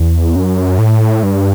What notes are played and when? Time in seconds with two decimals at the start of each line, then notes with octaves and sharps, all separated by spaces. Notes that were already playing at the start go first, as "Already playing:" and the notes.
Already playing: E2
0.36 F#2
0.78 A2
1.23 G2